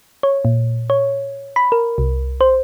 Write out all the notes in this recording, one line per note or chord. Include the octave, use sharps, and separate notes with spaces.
C#5
A#2
C#5
B5
A#4
C2
C5